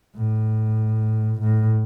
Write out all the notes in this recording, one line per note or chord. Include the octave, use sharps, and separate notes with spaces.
A2
A2